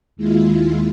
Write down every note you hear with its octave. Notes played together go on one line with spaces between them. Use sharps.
D#2 G#3 E4 F4